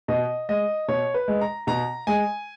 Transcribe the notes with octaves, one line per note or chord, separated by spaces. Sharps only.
B2 D#5
G#3 D#5
B2 C#5
B4
G#3
A#5
B2 A#5
G#3 G#5